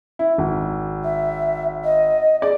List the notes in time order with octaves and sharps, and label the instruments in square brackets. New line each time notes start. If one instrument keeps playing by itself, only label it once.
[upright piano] E4
G#1
[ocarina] E5
D#5
[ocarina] G#4 [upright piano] D5